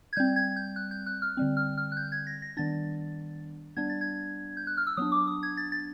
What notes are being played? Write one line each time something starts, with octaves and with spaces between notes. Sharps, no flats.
G#6
G3 C4 G6
G#6
G6
F#6
G6
F#6
F6
D3 G3 C4
F6
F6
F#6
G6
G#6
A#6
A#6
D#3 G3 B3 D4 A6
G3 B3 D4 G#6
A6
G#6
G6
F#6
F6
E6
F#3 B3 D4 D#6
D6
D#6
G#6
A6
A6